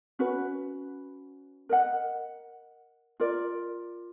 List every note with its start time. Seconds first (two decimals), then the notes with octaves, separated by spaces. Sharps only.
0.19 C#4 F#4 B4
1.69 A#4 D#5 F#5
3.20 F4 A#4 D5